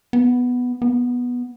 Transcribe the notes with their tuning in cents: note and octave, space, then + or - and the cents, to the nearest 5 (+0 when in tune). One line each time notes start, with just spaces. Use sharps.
B3 +0
B3 -10